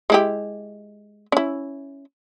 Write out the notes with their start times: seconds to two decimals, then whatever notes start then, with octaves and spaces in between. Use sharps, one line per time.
0.10 G#3 E4 G4
1.32 C#4 E4